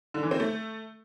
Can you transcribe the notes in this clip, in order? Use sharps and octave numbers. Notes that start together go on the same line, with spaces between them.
D3
E3
C4
A3